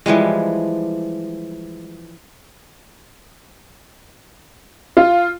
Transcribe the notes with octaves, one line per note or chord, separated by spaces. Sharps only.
E3 F3 G3 G#3
F4